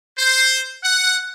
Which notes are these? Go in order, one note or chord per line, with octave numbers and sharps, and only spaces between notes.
C5
F#5